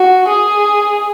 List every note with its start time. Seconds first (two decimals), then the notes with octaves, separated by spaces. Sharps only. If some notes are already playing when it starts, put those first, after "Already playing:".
Already playing: F#4
0.28 G#4